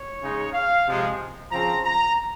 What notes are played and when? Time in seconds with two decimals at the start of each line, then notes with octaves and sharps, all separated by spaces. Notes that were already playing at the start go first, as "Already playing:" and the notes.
Already playing: C#5
0.22 C#3 G#3 D#4
0.53 F5
0.86 C3 F3 G#3
1.51 C#3 F3 C4 A#5
1.84 A#5